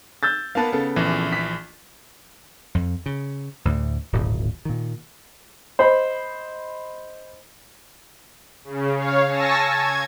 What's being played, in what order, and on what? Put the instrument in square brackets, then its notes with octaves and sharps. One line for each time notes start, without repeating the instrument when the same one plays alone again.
[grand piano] E6 G6 A6
[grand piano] A#3 B3 B4 [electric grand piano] F5 A5
[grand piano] C#3 B3 A4
[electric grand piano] A#1 E3
[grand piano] B6
[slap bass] F2
C#3
D2 A2 D3
D1 G#1 A#2
A#2 D#3
[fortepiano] C5 D#5 B5
[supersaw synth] C#3
C#5 F5
G#5 A5 C#6 E6 A#6
G#6